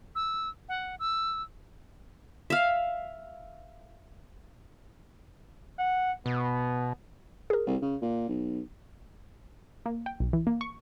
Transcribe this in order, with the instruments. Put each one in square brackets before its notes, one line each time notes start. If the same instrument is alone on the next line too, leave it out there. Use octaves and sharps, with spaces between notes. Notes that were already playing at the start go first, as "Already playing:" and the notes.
[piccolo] E6
F#5
E6
[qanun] E5 F5
[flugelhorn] F#5
[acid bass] B2 [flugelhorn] B3
[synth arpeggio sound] G#4 A#4
[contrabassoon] C2
C#3
A#2
B1
[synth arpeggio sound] A#3
G5
B1
E3
A#3
C#6